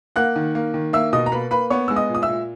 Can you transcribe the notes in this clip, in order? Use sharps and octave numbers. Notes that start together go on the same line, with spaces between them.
A#3 F#5 F#6
D#3
A#3
D#3
A#3 E5 E6
B2 D#5 D#6
A#5
A#3 B4 B5
A#3 B4 B5
B3 C#5 C#6
G#3 E6
D#5 D#6
A#2
D#6
E5 E6
A#2